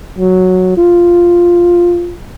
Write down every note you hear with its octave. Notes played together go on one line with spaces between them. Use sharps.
F#3
F4